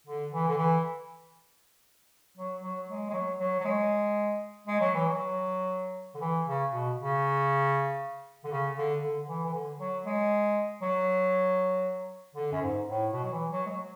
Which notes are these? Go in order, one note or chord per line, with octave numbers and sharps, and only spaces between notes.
D3
E3
D3
E3
F#3
F#3
G#3
G#3
F#3
F#3
F#3
G#3
G#3
F#3
E3
F#3
D3
E3
C#3
B2
C#3
D3
C#3
D3
D3
E3
E3
D3
F#3
G#3
F#3
D3
F#2
G#2
A2
B2
F#3
E3
F#3
G#3
F#3